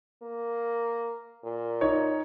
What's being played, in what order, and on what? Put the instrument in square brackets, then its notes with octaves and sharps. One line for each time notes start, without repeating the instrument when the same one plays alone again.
[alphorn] A#3
A#2
[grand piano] D#4 C#5